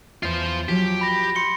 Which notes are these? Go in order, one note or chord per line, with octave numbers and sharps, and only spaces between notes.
E2 F4 C5
F3 F#3 G4
B5 A#6
C6 C#7 G7